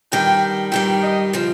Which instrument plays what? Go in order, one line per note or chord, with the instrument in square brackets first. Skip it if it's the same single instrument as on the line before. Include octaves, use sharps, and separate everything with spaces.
[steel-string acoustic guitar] G2 D#3 G3 [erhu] G5
[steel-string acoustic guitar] G2 D#3 G3 [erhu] G5
[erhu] D#5
[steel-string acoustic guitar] C#3 F3